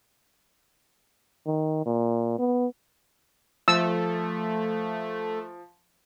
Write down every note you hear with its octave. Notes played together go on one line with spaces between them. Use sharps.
D#3
A#2
B3
F3 A3 E6 A6